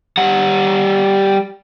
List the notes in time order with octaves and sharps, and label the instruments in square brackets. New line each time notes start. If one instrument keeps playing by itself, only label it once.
[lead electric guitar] G3 F#5